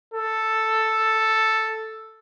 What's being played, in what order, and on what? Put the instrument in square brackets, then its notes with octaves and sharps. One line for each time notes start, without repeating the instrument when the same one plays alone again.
[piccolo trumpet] A4